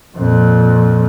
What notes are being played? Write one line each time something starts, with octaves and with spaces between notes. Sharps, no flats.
F2 A#2